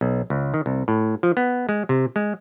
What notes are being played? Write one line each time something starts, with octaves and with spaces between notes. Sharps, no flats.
B1
C#2
D#3
C2
A2
F3
B3
G#3
C3
G#3